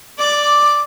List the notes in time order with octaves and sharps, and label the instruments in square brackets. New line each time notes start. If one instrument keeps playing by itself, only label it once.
[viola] D5 [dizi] D6